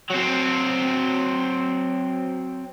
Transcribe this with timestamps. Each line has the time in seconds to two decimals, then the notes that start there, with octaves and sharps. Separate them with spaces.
0.10 F#3 C4